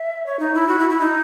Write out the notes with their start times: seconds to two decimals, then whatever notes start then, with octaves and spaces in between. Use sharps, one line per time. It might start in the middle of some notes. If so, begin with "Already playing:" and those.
Already playing: E5
0.26 C#5
0.39 D#4
0.55 E4
0.68 F#4
0.79 E4
0.90 E4
1.00 D#4